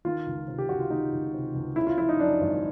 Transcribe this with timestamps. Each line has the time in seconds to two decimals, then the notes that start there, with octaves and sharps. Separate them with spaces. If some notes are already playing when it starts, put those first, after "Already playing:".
0.05 D#3 F4
0.26 C#2
0.48 C3
0.58 G4
0.69 C#2 F#4
0.80 F4
0.90 D#3 D#4
1.12 C#2
1.34 C3
1.54 C#2
1.76 C#3 E4
1.87 F4
1.98 F3 E4
2.09 D#4
2.19 F#2 D4
2.41 G#1